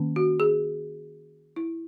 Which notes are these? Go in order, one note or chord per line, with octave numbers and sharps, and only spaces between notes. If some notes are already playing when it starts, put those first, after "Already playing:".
Already playing: D#3 A#3 C#4
F#4
G#4
E4